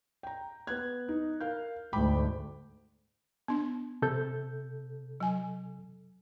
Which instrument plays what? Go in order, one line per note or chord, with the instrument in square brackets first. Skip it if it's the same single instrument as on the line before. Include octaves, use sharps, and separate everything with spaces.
[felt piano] G5 A#5
B3 F#6 G#6
D#4
A#4 F5 G6
[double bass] D2 G#2 [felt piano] G5 B5 D6
[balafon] B3 D4
[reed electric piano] C3 A4 G6
[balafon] F#3 G#5